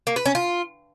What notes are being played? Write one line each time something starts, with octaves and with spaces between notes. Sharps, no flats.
A#3
B4
C#4
F4